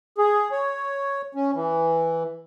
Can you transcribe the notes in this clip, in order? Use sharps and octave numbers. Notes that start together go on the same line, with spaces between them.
G#4
C#5
C#4
E3